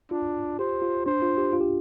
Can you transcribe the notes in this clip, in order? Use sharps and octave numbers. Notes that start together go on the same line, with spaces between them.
D4 F4
G4 C5
F4
D4 C5
F4
G4
F4
G4